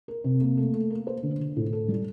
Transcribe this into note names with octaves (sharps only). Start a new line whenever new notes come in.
A#4
C3
A#3
A3
A3
A#3
C5
D3
D3
A2
A4
G3